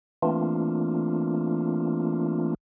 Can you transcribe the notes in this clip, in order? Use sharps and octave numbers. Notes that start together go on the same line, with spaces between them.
E3 A3 A#3 C4 D4 F4